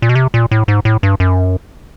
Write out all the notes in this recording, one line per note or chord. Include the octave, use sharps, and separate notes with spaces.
A#2
B2
C3
A#2
A2
G#2
A2
G2
F#2